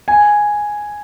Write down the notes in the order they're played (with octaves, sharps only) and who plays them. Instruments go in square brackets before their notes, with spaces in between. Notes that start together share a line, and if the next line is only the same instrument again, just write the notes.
[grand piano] G#5